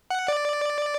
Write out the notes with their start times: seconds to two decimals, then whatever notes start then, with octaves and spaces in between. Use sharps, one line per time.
0.10 F#5
0.28 D5